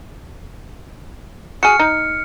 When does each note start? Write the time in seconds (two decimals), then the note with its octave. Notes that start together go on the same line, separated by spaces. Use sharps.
1.63 F#4 G#4 F6 C#7
1.80 D#4